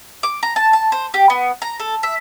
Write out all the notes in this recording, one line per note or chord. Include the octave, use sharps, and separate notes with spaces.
D6
A#5
A5
A5
C5
G4
B3
A#5
A4
E5